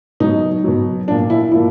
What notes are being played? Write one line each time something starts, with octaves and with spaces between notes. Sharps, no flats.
B2 F#3 D#4
B2 F#3
A#2 F3 D4
E4
A#2 F3 E4